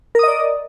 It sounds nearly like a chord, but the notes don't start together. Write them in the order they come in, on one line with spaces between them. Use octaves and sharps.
A#4 D#6 D#5 D5